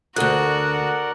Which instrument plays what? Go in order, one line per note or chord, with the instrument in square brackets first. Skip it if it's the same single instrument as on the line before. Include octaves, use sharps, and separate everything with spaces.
[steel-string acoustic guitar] D2 G#2 [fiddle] F#4 [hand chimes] A4 F#6 [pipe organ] A#4 D5 F#5